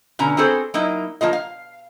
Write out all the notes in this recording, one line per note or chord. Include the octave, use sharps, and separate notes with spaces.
B2 D3 C#4 A#5
C4 F#4 G#4 A4 C5
F#3 A#3 D#4 E4
F3 A#3 F4 D#5
F5